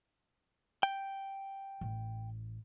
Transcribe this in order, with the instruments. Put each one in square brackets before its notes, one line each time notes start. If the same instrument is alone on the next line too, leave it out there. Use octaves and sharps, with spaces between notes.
[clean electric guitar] G5
[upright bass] A1